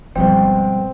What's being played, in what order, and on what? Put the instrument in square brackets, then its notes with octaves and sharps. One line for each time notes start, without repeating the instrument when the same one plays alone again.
[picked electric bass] G1 F3 G3 [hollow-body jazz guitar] G2 B2 G#3 [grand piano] C4 [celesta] G5